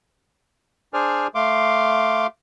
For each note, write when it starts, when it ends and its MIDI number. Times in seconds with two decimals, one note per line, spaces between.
0.94 1.27 62
0.94 1.27 68
0.94 1.27 72
0.94 1.27 74
0.94 1.27 80
0.94 1.27 89
1.35 2.27 57
1.35 2.27 77
1.35 2.27 84
1.35 2.27 86